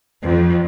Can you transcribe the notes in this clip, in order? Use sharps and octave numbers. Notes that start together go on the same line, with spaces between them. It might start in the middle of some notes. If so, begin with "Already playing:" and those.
F2